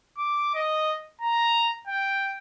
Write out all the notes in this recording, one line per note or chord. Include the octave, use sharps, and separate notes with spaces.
D6
D#5
A#5
G5